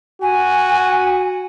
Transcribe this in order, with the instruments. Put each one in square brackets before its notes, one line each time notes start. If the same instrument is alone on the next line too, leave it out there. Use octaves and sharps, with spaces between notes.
[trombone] F#4 [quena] G#5